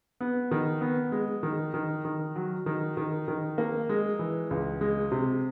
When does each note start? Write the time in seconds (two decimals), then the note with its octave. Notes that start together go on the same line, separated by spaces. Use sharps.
0.21 B3
0.51 D#3
0.81 B3
1.12 G#3
1.43 D#3
1.74 D#3
2.05 D#3
2.36 F#3
2.66 D#3
2.97 D#3
3.28 D#3
3.58 A#3
3.89 G#3
4.19 E3
4.50 C#2
4.81 G#3
5.12 C3